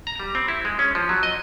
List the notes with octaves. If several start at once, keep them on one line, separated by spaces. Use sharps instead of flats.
A#5
G3
C4
E4
G#3
C#4
F3
F#3
D#5